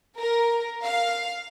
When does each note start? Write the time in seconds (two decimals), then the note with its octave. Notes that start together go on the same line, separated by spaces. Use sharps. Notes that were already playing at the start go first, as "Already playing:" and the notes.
0.18 A#4
0.83 F5